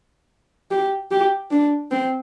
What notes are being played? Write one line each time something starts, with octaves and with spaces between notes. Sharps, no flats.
G4
G4
D4
C4